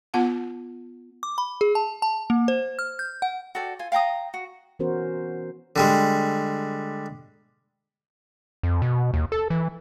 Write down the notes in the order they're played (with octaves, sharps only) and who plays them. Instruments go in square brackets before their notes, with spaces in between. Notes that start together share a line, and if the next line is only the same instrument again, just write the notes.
[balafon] B3 F4 F#5 A5
[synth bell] D6
B5
G#4
A5
A5
A#3
C5
F6
G6
F#5
[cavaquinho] F#4 A4 D5 G5
F4 G#5
F5 G5 A#5 D#6
F#4
[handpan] E3 B3 C#4 F#4 A#4 C5
[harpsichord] D3 G3 G#3
[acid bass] F2
B2
D#2
A4
E3